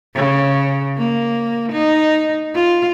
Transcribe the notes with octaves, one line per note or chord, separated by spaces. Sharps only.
C#3
A#3
D#4
F4